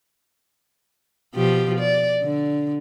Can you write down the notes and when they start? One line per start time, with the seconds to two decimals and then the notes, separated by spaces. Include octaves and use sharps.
1.35 B2 F3 G4
1.79 D5
2.23 D3